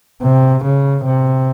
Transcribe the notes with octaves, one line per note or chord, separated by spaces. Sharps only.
C3
C#3
C3